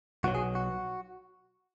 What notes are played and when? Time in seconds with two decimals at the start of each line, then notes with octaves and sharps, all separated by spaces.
0.24 B1 B2 F#3 F#4
0.35 G#4
0.55 F#4